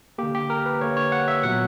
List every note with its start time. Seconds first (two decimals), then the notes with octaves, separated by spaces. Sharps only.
0.18 D3 A#3 G4
0.35 G4
0.50 A#4
0.66 B4
0.81 D3 A#3 C#5
0.97 C#5
1.12 F#5
1.28 E5
1.43 A#2 F#3 B3 F#5